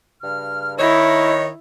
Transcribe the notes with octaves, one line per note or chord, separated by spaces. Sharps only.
G2 C#3 F6
D#3 E4 C#5 D#5